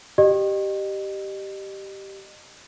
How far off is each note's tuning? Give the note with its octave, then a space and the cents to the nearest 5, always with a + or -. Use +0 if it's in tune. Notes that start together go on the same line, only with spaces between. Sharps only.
G4 -10 D#5 -35